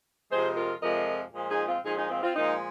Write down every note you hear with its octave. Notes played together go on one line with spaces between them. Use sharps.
F2 C3 F3 G#3 G#4 C5
F4 A#4
F2 C3 F3 G#3 A#4 D#5
A#2 F3 G#3
D#4 G#4
C4 F4
A#2 F3 G#3 D#4 G#4
D#4 G#4
C4 F4
C4 F4
A#2 F3 G#3 A#3 D#4